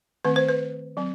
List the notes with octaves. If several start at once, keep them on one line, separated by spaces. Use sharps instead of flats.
D#3 A3 C4 B4
C5
B4
F#3 C4